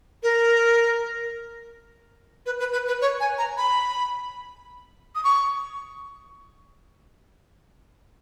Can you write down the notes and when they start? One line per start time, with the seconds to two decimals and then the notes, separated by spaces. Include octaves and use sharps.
0.23 A#4
2.46 B4
2.60 B4
2.73 B4
2.88 B4
3.01 C#5
3.20 G#5
3.38 A#5
3.57 B5
5.15 D#6
5.24 C#6